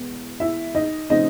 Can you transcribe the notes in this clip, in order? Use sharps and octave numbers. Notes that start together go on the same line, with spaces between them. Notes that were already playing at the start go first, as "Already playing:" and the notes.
Already playing: E2 B2 G#3 B3
E4 E5
D#4 D#5
C#3 F3 A3 C4 D#4 D#5